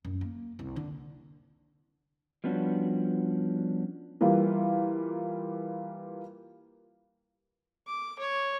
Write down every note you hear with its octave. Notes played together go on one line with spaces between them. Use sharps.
F#2
A#3
C2
D3
F3 G3 B3 C#4 D4 F#4
E3 G3 A#3 F4
D6
C#5